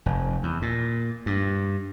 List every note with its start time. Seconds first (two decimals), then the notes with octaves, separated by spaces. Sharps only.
0.06 F1
0.43 E2
0.62 A#2
1.26 G2